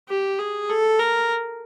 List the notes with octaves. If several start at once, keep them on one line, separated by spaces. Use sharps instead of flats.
G4
G#4
A4
A#4